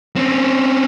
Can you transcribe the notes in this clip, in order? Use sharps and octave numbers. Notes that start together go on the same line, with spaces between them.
C4 C#4